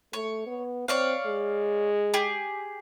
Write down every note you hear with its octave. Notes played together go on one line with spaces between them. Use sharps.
A3 C#5
B3
C4 C#5 D5 F5
G#3
G4 G#4